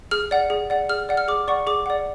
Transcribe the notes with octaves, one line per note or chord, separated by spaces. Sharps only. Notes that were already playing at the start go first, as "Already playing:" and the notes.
G#4 F6
D5 F#5
G#4
D5 F#5
G#4 F6
D5 F#5
F6
G#4 D6
D5 F#5 C#6
G#4 D6
D5 F#5